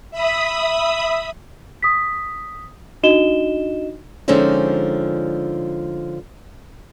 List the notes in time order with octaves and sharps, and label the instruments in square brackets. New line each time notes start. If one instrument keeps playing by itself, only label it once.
[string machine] E5 B5 D#6
[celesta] D#6 B6
D4 D#4 F#4 D#5 E7 G7
[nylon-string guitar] D3 F3 G#3 C4 C#4 D#4